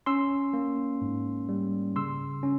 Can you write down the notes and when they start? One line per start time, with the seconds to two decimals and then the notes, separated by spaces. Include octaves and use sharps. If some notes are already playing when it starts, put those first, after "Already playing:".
0.06 C#4 C6 E6
0.53 A#3
1.02 G#2
1.49 G3
1.96 C#3 C6 E6
2.43 C#4